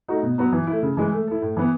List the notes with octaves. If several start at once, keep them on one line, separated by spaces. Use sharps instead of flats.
A3 D#4 F#4
B2
F#3 B3 F#4
E3
A3 E4
C#3
E3 G#3
A3
E4 A4
A2
E3 B3